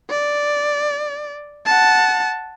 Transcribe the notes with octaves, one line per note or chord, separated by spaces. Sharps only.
D5
F#5 A5